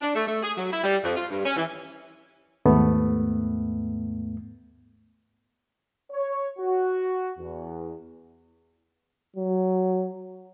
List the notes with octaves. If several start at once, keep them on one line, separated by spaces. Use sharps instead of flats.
D4
A3
A3
G#4
F#3
E4
G3
F2
F4
G2
C#4
E3
D#2 G#2 A3 B3
C#5
F#4
E2
F#3